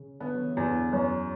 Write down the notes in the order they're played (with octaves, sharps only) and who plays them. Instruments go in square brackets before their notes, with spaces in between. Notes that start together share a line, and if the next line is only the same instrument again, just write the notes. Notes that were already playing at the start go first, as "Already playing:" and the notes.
Already playing: [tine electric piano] C#3
[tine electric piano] D3 [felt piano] B3
[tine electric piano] F#3
E3
[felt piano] E2
[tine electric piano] D3
[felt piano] F#2 [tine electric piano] E3
[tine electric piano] F#3